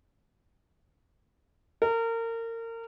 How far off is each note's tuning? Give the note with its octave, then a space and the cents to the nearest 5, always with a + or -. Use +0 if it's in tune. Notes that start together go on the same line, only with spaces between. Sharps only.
A#4 -30